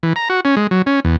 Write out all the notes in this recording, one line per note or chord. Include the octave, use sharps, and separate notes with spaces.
E3
A#5
F#4
C#4
G#3
F#3
C#4
E2